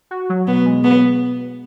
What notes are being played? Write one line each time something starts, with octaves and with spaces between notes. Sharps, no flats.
F#4
F#3
B2 B3
G#3
F#3 B3